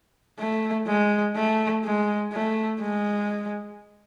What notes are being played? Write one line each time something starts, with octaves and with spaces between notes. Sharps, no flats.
A3
G#3
A3
G#3
A3
G#3